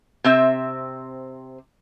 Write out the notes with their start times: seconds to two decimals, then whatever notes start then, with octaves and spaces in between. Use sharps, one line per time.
0.24 C3 C4 E5